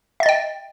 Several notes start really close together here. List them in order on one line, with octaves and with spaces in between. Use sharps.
E5 A6 D#5 G5